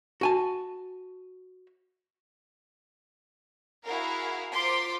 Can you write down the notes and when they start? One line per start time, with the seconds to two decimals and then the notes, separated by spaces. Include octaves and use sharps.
0.21 F#4 G#5 A5
3.86 E4 F#4 G#4 A#4 F5
4.53 F4 A#4 C5 C6 D6 B6